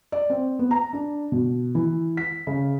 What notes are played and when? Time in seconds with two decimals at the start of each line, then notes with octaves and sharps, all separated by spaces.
0.12 D5
0.30 C4
0.59 B3
0.71 A#5
0.93 D4
1.32 B2
1.75 E3
2.17 B6
2.47 C#3